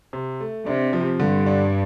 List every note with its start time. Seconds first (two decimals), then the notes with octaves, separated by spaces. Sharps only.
0.13 C3
0.40 A3
0.66 C3 D4
0.93 F3
1.19 G2 D3
1.46 D4